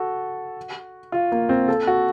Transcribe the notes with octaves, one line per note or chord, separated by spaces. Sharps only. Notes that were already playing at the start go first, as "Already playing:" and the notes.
Already playing: F#4 A4
F4
A#3
C4
A4
F#4